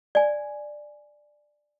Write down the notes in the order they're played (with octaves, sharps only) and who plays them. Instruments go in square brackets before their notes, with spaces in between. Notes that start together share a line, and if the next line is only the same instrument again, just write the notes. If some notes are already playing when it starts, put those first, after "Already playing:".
[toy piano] D5 G#5